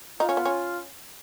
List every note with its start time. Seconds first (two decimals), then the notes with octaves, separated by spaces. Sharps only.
0.20 D#4 F4
0.29 C#4
0.37 B3
0.45 C#4